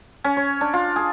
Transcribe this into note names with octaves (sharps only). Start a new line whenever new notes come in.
C#4
C#5
D4
F4
G#4